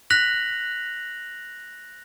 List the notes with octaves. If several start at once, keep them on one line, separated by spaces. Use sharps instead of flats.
F#6 A#6 B6 F7 F#7